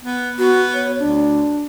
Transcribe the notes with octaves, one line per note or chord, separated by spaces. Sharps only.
B3
B3 F#4
C#5
D2 D4